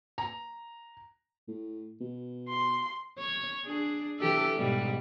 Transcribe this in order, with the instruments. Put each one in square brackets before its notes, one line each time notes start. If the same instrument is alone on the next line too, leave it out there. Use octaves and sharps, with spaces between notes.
[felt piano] A#5
[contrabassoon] A2
B2
[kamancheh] C6
[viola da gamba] C#5
D4 G#4
E3 G4 A4
G#2 B2 G3